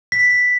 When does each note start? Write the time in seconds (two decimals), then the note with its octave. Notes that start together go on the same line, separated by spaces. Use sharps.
0.12 B6